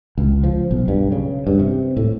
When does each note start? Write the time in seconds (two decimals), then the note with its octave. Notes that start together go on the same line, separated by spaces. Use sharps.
0.18 C#2
0.44 F3
0.71 B1
0.88 G2
1.12 C#3
1.47 G2
1.59 C3
1.97 A2